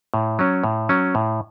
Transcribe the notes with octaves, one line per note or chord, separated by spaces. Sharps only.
A2
F#3 C#4
A2
F#3 C#4
A2